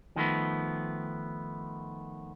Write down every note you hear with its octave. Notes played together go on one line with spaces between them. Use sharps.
D#3 F3 A3 B3